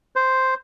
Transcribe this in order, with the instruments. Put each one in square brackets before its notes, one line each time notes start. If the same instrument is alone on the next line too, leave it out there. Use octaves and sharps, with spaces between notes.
[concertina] C5